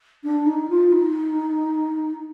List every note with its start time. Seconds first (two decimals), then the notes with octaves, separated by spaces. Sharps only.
0.23 D4
0.46 D#4
0.69 F4
0.92 D#4